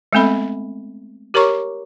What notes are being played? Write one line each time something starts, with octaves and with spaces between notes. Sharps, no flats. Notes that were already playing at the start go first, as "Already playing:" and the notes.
G#3 A3 B3 C4 A4 B5
G4 A#4 C#5 A#5 C#6 D6